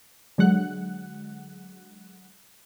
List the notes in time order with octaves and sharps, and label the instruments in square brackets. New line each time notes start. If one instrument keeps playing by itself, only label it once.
[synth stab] D3 F#3 G#3 F#5 F#6